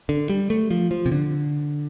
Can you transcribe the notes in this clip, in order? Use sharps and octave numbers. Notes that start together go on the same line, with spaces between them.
D3
G3
A3
F3
F3
C3
D3